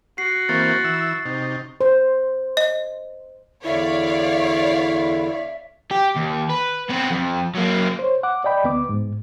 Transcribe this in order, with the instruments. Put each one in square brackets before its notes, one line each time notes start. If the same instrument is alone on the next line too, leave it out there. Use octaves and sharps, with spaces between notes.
[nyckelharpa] F#4 [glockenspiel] C7
[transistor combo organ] E3 A#3 C4 [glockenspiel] C#6 A6
[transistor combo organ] E3 E6
C3 D#4
[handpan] C5
[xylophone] D#5
[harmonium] E2 D3 [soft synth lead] E4 [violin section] C#5 D5 F5 [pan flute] E5
[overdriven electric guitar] G4
D#2
B4
B3 C4
F2
F#3 A#3
[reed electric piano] C5 C#5
F#5 D6
D5 D#5 G5 B5
D2 B3 D6
G#2